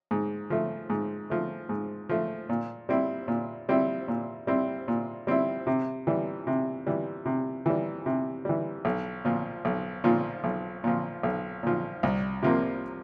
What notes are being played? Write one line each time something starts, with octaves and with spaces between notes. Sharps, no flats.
G#2
F3 A3
G#2
F3 A3
G#2
F3 A3
A#2
G3 C4 E4
A#2
G3 C4 E4
A#2
G3 C4 E4
A#2
G3 C4 E4
C3
E3 G3
C3
E3 G3
C3
E3 G3
C3
E3 G3
B1
A#2 F3
B1
A#2 F3
B1
A#2 F3
B1
A#2 F3
C2
C3 F3 A#3